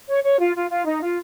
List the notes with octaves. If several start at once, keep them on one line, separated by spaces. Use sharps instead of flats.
C#5
C#5
F4
F4
F4
D#4
F4